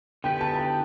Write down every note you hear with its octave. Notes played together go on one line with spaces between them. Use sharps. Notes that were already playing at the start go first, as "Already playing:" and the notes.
D3 B3 G4 B4 G5
A5
A5
G5